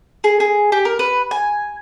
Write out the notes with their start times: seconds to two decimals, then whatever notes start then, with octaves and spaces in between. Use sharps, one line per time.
0.24 G#4
0.40 G#4
0.72 G4
0.85 A#4
0.99 B4
1.31 G#5